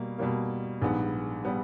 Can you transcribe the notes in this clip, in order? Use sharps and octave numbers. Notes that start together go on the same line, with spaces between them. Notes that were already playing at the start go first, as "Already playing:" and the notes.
Already playing: B2 G3 A#3
B2 G3 A#3
A#1 G#2 G3 B3
G3 B3